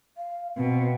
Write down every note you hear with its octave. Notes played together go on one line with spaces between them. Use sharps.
F5
B2 C4